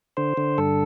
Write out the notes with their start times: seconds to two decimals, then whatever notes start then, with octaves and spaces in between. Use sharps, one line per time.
0.17 D3 C5
0.37 D3
0.58 G2 A4